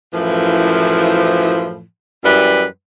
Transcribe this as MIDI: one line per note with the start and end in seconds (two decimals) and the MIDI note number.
0.14 1.83 42
0.14 1.83 45
0.14 1.83 52
0.14 1.83 53
2.24 2.65 42
2.24 2.65 52
2.24 2.65 55
2.24 2.65 64
2.24 2.65 71